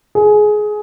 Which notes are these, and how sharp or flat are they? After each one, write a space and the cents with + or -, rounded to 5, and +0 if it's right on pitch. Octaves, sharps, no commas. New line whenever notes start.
G#4 +20